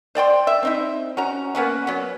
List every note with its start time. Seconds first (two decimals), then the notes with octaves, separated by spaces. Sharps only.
0.15 C5 D5 G5 C6
0.47 E5
0.63 C4 D#4 E4
1.17 C#4 F#4 A#5
1.55 A#3 B3 C#4 F#4
1.87 F#3 B3